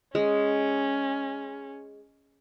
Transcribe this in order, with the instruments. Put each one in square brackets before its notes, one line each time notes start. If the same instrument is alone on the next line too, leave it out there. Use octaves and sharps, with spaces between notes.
[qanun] G#3 [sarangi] C#4